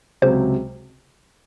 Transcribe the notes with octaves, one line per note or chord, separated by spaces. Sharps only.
C#2 C3 F#3 C5